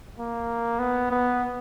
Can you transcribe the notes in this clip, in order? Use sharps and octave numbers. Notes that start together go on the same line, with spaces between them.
A#3
B3
B3